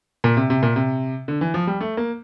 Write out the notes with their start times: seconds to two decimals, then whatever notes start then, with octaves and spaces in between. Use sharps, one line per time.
0.24 A#2
0.37 C3
0.50 C3
0.63 A#2
0.76 C3
1.28 D3
1.41 E3
1.54 F3
1.67 G3
1.80 A3
1.97 A#3